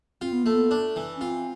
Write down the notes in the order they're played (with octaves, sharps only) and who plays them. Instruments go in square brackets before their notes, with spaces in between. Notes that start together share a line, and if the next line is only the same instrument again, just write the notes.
[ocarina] C4 [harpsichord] F4
[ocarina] B3
[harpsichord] A3 [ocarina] A#3
[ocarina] B3
[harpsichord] D4
E3
[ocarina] C#4
[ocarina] C4 [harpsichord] F4